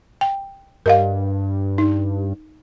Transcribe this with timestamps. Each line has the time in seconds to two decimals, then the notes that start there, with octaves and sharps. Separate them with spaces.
0.21 G5
0.86 G2 A#4 D#5 F5
1.78 D#4